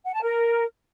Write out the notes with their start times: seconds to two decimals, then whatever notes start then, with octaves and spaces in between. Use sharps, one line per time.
0.05 F#5
0.13 A5
0.21 A#4